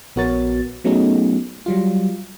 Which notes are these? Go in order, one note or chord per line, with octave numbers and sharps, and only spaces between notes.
A#1 B3 F#4 A#4 C#5 A6
F#3 A3 B3 C#4 D#4 G#4
F#3 G3 F4